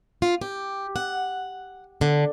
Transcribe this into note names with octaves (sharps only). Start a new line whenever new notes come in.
F4
G4
F#5
D3